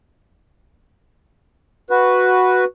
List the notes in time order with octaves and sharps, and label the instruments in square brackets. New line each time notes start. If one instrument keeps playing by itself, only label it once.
[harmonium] F#4 B4